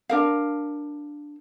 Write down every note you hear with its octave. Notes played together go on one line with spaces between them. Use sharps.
D4 A#4 F5